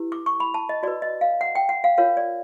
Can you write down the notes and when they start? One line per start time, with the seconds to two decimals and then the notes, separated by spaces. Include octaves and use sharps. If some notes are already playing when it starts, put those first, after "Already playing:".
Already playing: E4 G4 B4
0.12 D6
0.26 C#6
0.40 B5
0.54 A5
0.69 D#5
0.83 F#4 B4 D5
1.02 D#5
1.21 F5
1.41 F#5
1.55 G5
1.69 F#5
1.84 F5
1.98 F4 A#4 C#5 F5
2.17 D5